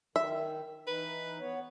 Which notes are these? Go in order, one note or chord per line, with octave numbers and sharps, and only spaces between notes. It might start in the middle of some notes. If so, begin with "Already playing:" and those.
D#3 E5
E3 D#4 B4
B3 C#5